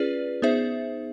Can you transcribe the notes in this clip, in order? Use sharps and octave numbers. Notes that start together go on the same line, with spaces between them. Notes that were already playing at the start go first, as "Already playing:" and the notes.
Already playing: C#4 F4 G#4 B4 D5
B3 D#4 G#4 C5 E5